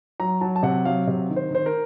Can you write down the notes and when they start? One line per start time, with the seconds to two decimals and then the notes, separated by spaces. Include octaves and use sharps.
0.20 F#3 A#5
0.41 F#3 A5
0.56 A5
0.63 C3 F#5
0.85 F#3 F5
1.07 C3
1.30 D#3
1.36 C5
1.51 D#3 C5
1.66 A#4